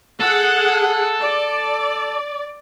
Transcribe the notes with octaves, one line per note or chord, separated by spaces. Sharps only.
G#4 A4 F#5
D5